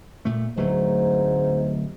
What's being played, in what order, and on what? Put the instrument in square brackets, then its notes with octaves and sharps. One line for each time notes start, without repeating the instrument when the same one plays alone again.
[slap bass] A#2 A3
[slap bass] D1 F#3 A3 [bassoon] G#2